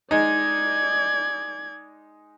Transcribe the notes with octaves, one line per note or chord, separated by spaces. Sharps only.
G#3 D#4 D5 G#6